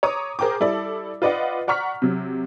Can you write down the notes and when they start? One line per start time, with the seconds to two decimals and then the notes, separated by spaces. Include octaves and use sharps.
0.03 C#5 A#5 D6 D#6
0.39 G#4 A#4 C5 G5 A#5 D6
0.60 G3 E4 A4 D5
1.22 F4 B4 D5 D#5 F#5
1.68 D5 F#5 A#5 C#6 F6 B6
2.02 C3 F#3